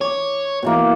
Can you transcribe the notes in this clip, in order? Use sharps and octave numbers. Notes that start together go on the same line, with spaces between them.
C#5 D6
B2 E3 A#3